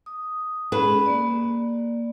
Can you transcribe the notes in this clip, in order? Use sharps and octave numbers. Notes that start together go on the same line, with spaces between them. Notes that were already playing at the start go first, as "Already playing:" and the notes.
D#6
G#3 C#4 G#4 B4
A#3 D5